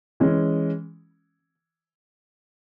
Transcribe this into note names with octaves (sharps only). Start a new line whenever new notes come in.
E3 G#3 C#4